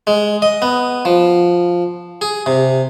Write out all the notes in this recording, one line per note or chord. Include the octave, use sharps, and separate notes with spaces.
G#3
D#5
B3
F3
G#4
C3